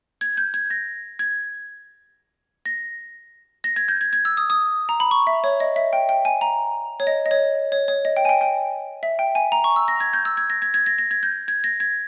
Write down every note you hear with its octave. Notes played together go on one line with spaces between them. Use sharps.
G#6
G6
G#6
A#6
G#6
A#6
A#6
G#6
G6
G#6
G#6
E6
D#6
D#6
A#5
B5
C#6
E5
C#5
D#5
E5
G5
G5
G#5
A#5
C#5
D#5
D#5
C#5
C#5
C#5
D#5
G5
G#5
G5
G5
E5
G5
G#5
A#5
C#6
E6
A#6
G#6
G6
E6
G#6
A#6
G#6
G#6
A#6
A#6
G#6
G6
G#6
A#6
G#6